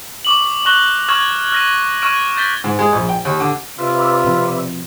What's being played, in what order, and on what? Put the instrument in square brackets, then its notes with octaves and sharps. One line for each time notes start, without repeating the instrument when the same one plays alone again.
[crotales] C#6 D6 F#7
C#6 D6 F#6 A#6 F7 G7
C#6 F6 G#6 F#7
F6 A#6 D#7
C#6 F6 G#6 D7 D#7
C#6 G6 A6 B6 G7
[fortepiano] G#2
G#3
A#1
G5
D#2
D3
[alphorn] C3 [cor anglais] F4 [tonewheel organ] B4 D5 E5
[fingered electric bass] B2 F3 C4